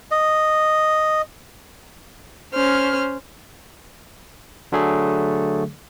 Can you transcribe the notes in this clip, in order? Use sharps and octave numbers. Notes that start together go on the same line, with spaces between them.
D#5
C#4 C5 F6
D3 F#3 A3 G#4